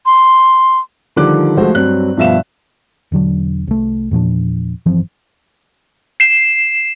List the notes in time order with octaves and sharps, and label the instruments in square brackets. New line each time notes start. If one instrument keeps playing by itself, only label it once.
[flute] C6
[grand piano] D3 D#3 F3 G3 D6 F#6
F3 G#3 A3 F#4 C5
G2 F#3 C4 F#6
G2 B2 F3 E5 F5 E7
[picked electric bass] E1 D3 F#3 D4
C2 A3
E2 A#2 F3 D4
G1 E3 F3 C4
[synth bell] C7 E7